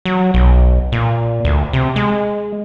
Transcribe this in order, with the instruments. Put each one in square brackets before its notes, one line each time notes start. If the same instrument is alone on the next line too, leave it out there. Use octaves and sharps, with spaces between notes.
[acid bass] F#3
B1
A#2
D2
C3
G#3